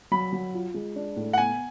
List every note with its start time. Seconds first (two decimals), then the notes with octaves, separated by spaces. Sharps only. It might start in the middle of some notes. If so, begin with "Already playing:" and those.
0.11 F#3 B5
0.32 F#3
0.54 F4
0.74 G#3
0.96 D4
1.16 A2
1.33 F#5
1.37 B3 G#5